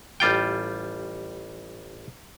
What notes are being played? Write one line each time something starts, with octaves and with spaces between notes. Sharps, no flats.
A1 G3 F4 G5